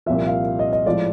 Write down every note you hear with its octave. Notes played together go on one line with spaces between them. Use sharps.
C2 A#2 F3 E5
F5
D#5
D#5
A2 F3 G#3 D5